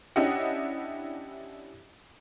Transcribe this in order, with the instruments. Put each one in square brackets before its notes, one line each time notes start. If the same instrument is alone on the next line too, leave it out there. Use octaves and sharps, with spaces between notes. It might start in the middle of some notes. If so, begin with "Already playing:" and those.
[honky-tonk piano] C#4 D4 E4 G4 D#5 F#5